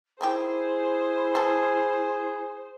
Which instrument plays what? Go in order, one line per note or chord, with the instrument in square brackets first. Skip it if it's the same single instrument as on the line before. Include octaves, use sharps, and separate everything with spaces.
[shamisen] D#3 A#3 G4 [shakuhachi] E4 [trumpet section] G#4 [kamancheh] C5
[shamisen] E3 B3 A4